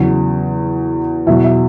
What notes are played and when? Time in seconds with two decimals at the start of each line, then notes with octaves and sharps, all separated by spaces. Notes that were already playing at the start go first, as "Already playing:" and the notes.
Already playing: E2 C#3 F#3
1.27 E2 B2 F#3 E5
1.44 E5